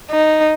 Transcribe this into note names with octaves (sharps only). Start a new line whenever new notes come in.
D#4